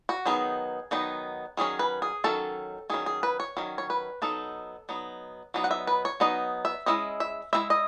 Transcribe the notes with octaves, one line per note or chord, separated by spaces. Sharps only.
F#4
D#3 F#3 B3 D#4 G#4
D#3 F#3 B3 D#4
D#3 F#3 C#4 G#4
B4
G#4
D#3 F#3 C#4 A4
D#3 F#3 C#4 G#4
G#4
B4
C#5
D#3 F#3 C#4
C#5
B4
F#3 B3 D#4 A4
F#3 B3 D#4
F#3 B3 D#4
F#5
E5
B4
C#5
F#3 B3 D#4 D#5
E5
G#3 C#4 E4 D#5
E5
G#3 C#4 E4 E5
D#5